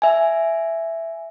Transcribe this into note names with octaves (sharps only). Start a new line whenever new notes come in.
E5 G#5